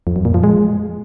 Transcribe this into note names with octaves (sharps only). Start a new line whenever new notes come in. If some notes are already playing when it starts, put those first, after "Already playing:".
F2
F#2
A#2
F3
G#3